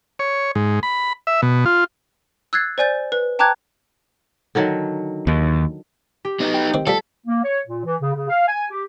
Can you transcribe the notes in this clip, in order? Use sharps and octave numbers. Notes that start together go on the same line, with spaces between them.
C#5
G#2
B5
E5
B2
F4
E6 F#6 G#6 A6 C7
C5 D5 G#5 G6 A6
B4
G5 A5 A#5 D6 F#6 G#6
D3 D#3 F#3
D#2
G4
B3 D#4
G5
D#3 C4
F3 G3 A4 E6 B6
A#3
C#5
A#2
E3
C#3
C#3
F5
G#5
G4